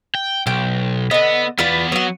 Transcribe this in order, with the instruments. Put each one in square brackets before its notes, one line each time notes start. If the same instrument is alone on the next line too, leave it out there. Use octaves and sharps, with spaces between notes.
[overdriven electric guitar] G5
[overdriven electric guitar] B1 [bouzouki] G5
[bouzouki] D3 D#5 [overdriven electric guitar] B3
[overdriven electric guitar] E2 B3 [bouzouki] F4 B4 D5
[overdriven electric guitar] F#3 [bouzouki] B3 F#4